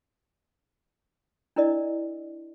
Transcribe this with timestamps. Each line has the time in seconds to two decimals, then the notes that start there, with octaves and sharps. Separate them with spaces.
1.56 D4 E4 A#4 D5 D#5